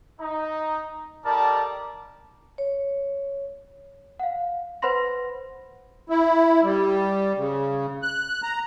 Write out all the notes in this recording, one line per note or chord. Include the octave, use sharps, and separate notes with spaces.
D#4
G3 D#4 A4 A#4 D5 A5
C#5
F5 F#5
B4 C5 F#5 B5 C6 A#6
E4
G3
C#3
F#6
A#5